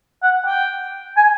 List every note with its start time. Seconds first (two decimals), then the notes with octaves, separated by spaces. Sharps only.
0.23 F#5
0.47 G5
1.17 G#5